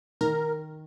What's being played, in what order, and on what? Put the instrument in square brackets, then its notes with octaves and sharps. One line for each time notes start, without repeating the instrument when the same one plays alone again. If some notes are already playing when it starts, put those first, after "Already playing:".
[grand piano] D#3 [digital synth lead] A#4